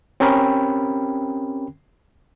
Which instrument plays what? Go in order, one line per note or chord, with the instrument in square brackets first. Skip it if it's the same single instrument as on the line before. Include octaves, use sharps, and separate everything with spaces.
[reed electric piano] C4 C#4 G4 A#4 G5 B5